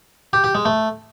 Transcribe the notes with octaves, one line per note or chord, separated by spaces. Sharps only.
G4
G4
G#3
A3